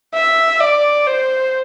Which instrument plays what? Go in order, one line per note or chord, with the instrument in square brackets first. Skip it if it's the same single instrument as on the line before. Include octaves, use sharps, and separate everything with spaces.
[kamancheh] E5
D5
C5